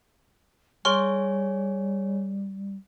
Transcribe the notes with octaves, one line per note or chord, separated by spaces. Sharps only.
G3 G#4 C#5 G#5 C6 C#6 F6